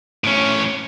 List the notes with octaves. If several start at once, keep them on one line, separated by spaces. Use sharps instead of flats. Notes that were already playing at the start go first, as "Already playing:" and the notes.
A2 C#4